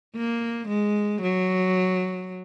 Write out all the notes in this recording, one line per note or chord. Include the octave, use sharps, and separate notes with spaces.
A#3
G#3
F#3